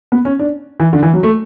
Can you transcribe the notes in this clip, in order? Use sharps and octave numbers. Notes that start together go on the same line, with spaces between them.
B3
C#4
D4
E3
D3
E3
F#3
A3